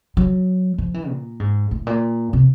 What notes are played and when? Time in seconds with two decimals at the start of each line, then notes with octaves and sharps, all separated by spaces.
0.17 F#3
0.78 F3
0.94 E3
1.09 A#2
1.40 G#2
1.71 A2
1.87 A#2
2.33 C3